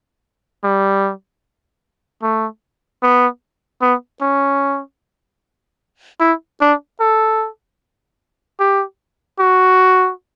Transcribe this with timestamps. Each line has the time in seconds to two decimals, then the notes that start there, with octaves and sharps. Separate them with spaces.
0.64 G3
2.22 A3
3.03 B3
3.82 B3
4.21 C#4
6.20 E4
6.61 D4
7.00 A4
8.60 G4
9.39 F#4